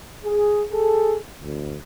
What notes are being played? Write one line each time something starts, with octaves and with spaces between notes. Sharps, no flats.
G#4
G#4 A4
D2